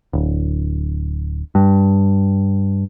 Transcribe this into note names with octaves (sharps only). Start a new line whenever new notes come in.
D1
G2